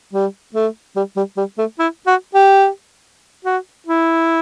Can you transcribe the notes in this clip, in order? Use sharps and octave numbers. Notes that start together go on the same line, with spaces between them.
G3
A3
G3
G3
G3
A3
E4
F#4
G4
F#4
E4